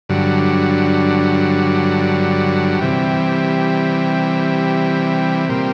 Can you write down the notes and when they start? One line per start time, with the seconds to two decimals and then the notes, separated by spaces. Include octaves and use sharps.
0.09 G2 D3 F#3
2.79 C3 E3 G3
5.49 A#2 G3 C4